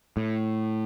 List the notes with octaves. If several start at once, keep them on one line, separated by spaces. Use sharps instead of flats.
A2